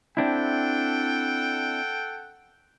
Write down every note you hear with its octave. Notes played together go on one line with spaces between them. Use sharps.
C4 D4 E4 A4 F#5 G5